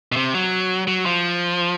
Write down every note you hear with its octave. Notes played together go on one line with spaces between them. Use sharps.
B2
C3
F#3
F#3
F3